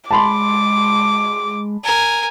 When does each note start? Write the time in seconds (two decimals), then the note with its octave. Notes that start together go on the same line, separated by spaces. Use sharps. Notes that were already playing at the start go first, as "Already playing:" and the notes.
0.11 G#3 A5 B5 C6 D6
1.84 A#4 G#5